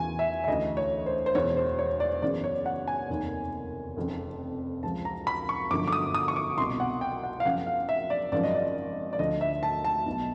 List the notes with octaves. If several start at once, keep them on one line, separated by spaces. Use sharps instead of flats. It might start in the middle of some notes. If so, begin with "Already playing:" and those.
Already playing: E2 C#3 E3 G#5
E5
E5
D2 C#3 E3 D#5
C#5
C5
C5
E1 E2 B2 C#5
C5
C#5
D5
F#1 E2 C#3 D5
C#5
F#5
G#5
F1 D#2 D#3
F1 F2 C#3
C#2 C#3 F3 A5
A#5
B5
C#6
G1 F#2 D3 F3 D6
D6
D#6
D#6
C#6
D6
C2 B2 C6
F#5
G5
F#5
F5
F#1 F#2 C#3 F3 F#5
F5
E5
D5
G#1 F#2 C#3 F3 D5
D#5
D5
D5
D2 D3 F3 D#5
E5
A5
A5
B1 B2